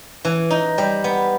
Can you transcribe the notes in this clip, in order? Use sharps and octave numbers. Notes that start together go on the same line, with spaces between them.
E3
D#4
G3
B3